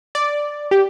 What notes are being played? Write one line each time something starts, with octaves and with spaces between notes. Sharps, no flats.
D5
G4